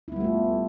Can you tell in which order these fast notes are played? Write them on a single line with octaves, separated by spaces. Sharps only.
E4 B3 G3 A3 F4